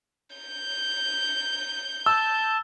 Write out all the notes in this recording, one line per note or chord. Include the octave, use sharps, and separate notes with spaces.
G6
A5 E6